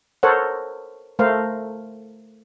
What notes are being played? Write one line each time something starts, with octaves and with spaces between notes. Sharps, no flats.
A4 A#4 C5 C#5 F#5
A3 A#4 C5 F5